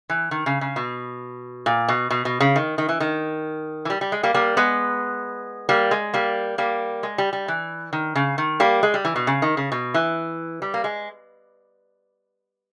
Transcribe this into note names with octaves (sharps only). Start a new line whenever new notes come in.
E3
D#3
C#3
C#3
B2
A#2
B2
B2
B2
C#3
D#3
D#3
E3
D#3
E3
G3
G3
G#3
G3 A#3
G3 A#3
G#3 B3
G3 A#3
G#3
G3 A#3
G3 A#3
G#3
G3
G3
E3
D#3
C#3
D#3
G3 A#3
G#3
G3
E3
B2
C#3
D#3
C#3
B2
E3
G3
A#3
G#3